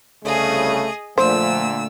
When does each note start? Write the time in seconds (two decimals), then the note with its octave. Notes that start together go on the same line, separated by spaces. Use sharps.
0.24 C2 C#3 A3 G#4 D#5
1.18 A#2 D3 F3 A3 C5 E6